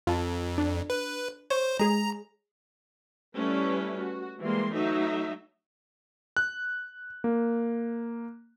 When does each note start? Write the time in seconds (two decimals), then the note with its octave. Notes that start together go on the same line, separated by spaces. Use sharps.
0.07 F2 F4 A5
0.58 D4
0.90 B4
1.50 C5 C#5
1.79 G#3 G#4 A#5
3.36 G3 A3 C#4 E4 B4
3.97 F#4
4.40 E3 G3 G#3 A#3 C6
4.72 F#3 A3 D#4 E5
6.37 F#6
7.24 A#3